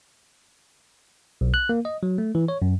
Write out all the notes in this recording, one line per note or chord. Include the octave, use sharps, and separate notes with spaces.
B1
F#6
A#3
D#5
F#3
A3
E3
C#5
F#2